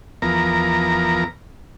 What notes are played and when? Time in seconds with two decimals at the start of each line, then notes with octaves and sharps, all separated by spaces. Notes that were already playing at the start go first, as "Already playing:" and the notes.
0.22 E2 F3 B3 A#4 A#5